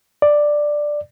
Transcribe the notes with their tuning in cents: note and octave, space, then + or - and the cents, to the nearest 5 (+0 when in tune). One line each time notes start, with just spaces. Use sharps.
D5 +5